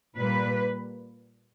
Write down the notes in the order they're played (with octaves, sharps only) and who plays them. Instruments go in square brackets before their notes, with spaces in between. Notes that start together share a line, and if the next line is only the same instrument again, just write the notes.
[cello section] A#2 G3 A#3 B4